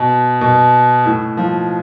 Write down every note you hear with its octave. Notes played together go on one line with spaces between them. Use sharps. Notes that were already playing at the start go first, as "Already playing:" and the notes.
Already playing: B2
B2
A2
F3